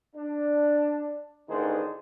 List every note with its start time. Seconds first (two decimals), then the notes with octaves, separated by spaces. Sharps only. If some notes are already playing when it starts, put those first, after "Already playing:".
0.16 D4
1.49 A1 D#3 D4 D#4 G#4 C5